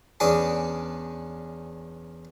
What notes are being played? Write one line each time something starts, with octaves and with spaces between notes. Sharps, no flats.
E2 C#4 D4 D6 D#6